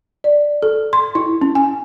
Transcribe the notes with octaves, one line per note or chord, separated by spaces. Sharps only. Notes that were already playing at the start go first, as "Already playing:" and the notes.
D5
A4
C6
E4
C#4
G#5